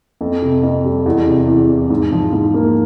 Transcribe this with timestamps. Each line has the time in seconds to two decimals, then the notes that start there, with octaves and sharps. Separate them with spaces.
0.21 F2
0.42 C3
0.63 F2
0.85 G3
1.06 E2
1.26 C3
1.47 E2
1.69 E3
1.90 G#2
2.12 F3
2.33 G#2
2.54 A#3